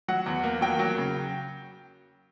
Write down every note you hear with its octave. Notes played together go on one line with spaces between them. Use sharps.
F#3 F#5
E2
A#3
F#3 G5
F#3
C#3